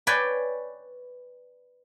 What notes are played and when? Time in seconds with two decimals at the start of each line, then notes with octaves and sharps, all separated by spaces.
0.07 B4 C#5 D5 G5 G#5